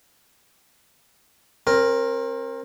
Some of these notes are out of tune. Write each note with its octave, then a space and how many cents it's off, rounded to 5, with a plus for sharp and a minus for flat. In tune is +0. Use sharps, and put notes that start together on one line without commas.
C4 +35 A#4 +0